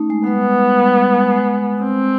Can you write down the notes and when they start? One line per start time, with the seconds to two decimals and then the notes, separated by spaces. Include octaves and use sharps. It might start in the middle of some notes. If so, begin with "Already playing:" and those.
Already playing: A3 C#4 D#4
0.10 G#3
0.24 G#3
0.27 G3 B3
0.79 G3
0.96 G3
1.14 G#3
1.31 G#3
1.83 C4